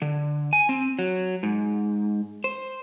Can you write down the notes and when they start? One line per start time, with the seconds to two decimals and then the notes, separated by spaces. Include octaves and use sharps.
0.02 D3
0.53 G#5
0.69 C4
0.99 F#3
1.43 G#2
2.44 C5